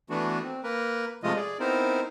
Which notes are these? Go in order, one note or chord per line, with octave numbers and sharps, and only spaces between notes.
E3 A3 B3 D4 F#4
C4
A#3 A#4 B4
C3 F3 G#3 A3 F4 D#5
G#4 D5
B3 C4 D#4 E4 A#4 C5